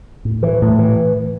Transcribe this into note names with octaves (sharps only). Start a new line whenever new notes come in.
A2
E3
A2
E3